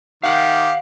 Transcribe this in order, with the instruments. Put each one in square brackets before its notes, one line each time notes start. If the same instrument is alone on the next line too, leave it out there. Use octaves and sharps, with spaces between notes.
[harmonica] D#3 G4 [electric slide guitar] F5 F#5